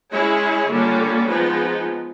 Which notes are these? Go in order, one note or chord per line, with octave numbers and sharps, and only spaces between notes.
G#3 C#4 E4 G#4 C#5
D3 G3 A#3 C#4 F4
F3 G#3 B3 D#4 G#4